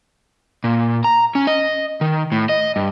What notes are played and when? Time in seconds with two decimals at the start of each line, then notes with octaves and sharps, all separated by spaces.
0.64 A#2
1.04 A#5
1.35 C#4
1.47 D#5
2.01 D#3
2.32 A2
2.49 D#5
2.76 G2